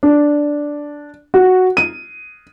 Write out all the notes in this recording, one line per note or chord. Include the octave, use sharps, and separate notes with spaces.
D4
F#4
D#7